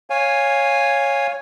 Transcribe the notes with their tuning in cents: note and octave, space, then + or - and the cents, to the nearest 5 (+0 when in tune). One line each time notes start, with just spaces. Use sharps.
C#5 +0 F5 +5 G#5 -15